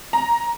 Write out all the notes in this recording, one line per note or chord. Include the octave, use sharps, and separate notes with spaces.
A#5